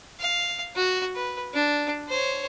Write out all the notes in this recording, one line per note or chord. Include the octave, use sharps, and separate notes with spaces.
F5
F#4
B4
D4
C5 C#5